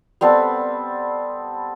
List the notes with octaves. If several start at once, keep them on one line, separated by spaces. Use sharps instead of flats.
G3 B3 C4 A4